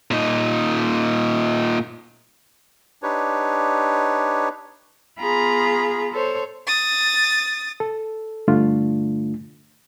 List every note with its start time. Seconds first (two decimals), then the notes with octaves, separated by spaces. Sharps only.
0.11 A#2 D#4
3.03 D4 D#4 G4 B4 C#5
5.19 B3 F4 G#4 A#5 B5
6.12 A4 C5 C#5
6.67 D#6 A6
7.80 A4
8.48 G2 D3 A3 D4 F4